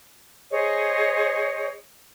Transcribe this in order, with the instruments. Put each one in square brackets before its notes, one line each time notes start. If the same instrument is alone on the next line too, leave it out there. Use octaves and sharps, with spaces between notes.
[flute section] G#4 C5 C#5 D#5